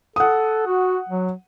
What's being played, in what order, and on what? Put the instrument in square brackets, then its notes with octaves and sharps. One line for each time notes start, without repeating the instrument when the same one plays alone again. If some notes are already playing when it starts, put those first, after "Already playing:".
[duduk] A4 [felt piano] F#5 D#6
[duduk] F#4
F#3